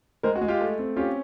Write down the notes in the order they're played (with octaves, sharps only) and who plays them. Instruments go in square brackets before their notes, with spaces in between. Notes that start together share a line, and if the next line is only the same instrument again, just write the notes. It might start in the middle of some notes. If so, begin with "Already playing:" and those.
[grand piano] G#3 A#4 C5
F#4
G#3
F4 G4
A3
C4
C#4 F4 G4